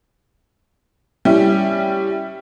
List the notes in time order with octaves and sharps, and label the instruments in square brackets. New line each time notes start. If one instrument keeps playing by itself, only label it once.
[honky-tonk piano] G3 C#4 E4